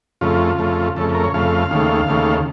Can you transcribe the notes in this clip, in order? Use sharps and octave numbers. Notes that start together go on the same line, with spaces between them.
F2 C#3 A3 F4
F2 C#3 A3
F2 C#3 A3 A4
A#4
C#5
F2 C#3 A3 F5
D#2 C#3 A3
D#2 C#3 A3